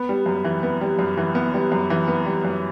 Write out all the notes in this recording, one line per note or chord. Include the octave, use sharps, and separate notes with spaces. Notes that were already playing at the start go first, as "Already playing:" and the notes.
Already playing: B3
G3
F#2
E3
B3
G3
F#2
E3
B3
G3
F#2
E3
B3
G3
F#2